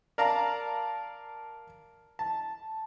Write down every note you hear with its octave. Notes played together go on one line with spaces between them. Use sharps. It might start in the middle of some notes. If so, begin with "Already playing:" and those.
A#4 D5 F5 A5 A#5
A5